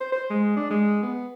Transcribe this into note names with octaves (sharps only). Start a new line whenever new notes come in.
C5
C5
G#3
D4
G#3
B3